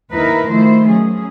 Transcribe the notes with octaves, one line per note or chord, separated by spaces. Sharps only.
D#2 D#4 E4 A#4 B4
D#3 F3 A3 E4 C5
F#3 C#4 G#4